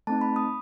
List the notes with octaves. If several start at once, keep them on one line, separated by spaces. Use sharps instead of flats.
A3 C4 D#4 A5
B5
D#6